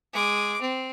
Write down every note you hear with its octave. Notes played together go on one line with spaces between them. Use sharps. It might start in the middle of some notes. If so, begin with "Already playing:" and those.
G#3 D6
C4